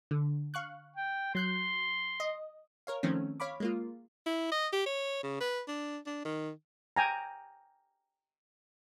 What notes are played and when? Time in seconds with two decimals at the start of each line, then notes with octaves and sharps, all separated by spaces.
0.11 D3
0.54 F5 C#6 F#6
0.96 G5
1.35 F#3 C6 F#6 G6
2.20 D#5
2.87 A#4 C#5 F5
3.03 D#3 F3 A3 C4 C#4
3.40 C#5 F5 B5 D6
3.60 G#3 A#3 F4
4.26 E4
4.52 D#5
4.73 G4
4.86 C#5
5.23 C#3
5.40 B4
5.68 D4
6.06 D4
6.25 D#3
6.96 G5 G#5 A#5